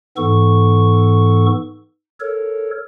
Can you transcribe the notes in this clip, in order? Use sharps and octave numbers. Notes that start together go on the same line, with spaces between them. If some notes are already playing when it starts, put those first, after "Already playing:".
G#2 E3 B3 A4 C#6
A4 A#4 C#5